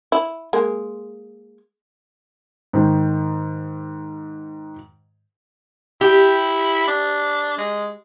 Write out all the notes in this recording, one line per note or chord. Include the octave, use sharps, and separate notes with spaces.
E4
G#3 A#3
G#2 D#3
E4 G4
D4
G#3